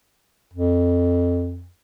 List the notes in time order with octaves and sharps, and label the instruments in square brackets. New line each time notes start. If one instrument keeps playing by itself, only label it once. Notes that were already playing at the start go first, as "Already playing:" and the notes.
[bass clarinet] F2